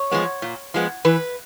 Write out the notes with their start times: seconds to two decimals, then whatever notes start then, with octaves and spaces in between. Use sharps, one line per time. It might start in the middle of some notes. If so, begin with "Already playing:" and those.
Already playing: C#5
0.11 F3 G#3 B3
0.42 A#2
0.74 F3 G#3 B3
1.05 E3 B4